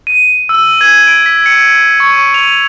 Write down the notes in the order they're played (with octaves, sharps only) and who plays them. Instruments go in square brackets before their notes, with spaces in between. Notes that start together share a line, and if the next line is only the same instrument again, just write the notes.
[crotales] D#7
E6
G#6
D7
B6
C#7
C#6
F7